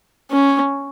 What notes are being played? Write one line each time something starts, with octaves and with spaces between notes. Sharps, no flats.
C#4